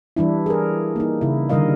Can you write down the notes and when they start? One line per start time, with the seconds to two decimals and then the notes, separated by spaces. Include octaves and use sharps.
0.17 E3 G3 D4 E4
0.46 G#4 A#4
0.96 A#3 D#4
1.21 C#3 E4
1.49 D3 D#3 G3 A#4 D#5 F5